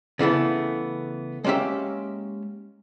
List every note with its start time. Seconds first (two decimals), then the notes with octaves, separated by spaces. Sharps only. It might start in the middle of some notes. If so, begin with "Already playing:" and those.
0.19 C#3 E3 A3 B3
1.44 G#3 A#3 C#4 G4 E5